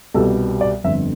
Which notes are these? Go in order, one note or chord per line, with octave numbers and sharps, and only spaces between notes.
C2 B2 G3 A4
D5
G1 F2 D3 E5